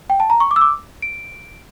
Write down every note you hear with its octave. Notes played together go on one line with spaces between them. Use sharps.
G5
A5
A#5
C#6
D6
E6
D6
D7